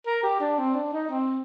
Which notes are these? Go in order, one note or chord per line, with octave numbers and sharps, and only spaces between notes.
A#4
G4
D4
C4
D4
D#4
C4